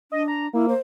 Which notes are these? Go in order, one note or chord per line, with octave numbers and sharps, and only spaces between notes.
D4 D#5
A#5
A#3 E4
C5